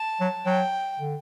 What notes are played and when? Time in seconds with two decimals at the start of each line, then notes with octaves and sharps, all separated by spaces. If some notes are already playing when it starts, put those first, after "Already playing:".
Already playing: A5
0.21 F#3
0.46 F#3 G5
1.00 D3